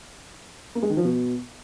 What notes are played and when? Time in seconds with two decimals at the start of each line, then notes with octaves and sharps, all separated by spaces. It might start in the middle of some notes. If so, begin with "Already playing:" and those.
0.75 A#3
0.82 G#3
0.90 D#3
0.97 F3
1.04 B2